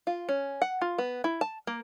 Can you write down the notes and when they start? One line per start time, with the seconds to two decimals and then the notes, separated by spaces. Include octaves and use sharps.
0.07 F4
0.29 C#4
0.62 F#5
0.81 F4
0.98 B3
1.24 E4
1.41 A5
1.67 A#3